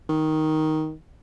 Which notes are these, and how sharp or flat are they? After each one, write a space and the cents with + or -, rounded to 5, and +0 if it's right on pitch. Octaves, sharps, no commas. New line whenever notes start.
D#3 +5